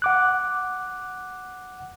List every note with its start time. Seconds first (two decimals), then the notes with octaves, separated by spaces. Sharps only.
0.02 F#5 D6 F#6